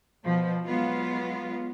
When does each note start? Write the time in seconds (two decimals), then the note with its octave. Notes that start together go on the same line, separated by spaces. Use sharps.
0.25 B2 F3
0.67 F#3 G#3 B3 F4